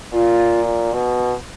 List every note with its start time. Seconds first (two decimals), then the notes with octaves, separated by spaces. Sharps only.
0.13 A#2 F4
0.93 B2